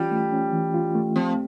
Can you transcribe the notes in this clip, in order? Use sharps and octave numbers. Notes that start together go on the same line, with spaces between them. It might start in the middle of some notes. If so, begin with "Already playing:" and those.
Already playing: E3 G3 C#4 F4
A3
C#4
E3
F4
A3
F3 C4